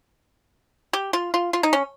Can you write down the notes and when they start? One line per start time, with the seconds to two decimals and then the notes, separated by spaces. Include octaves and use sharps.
0.93 G4
1.13 F4
1.34 F4
1.53 F4
1.63 D#4
1.73 C#4